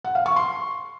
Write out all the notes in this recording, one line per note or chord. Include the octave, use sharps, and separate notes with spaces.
F#5
F5
C#6
C6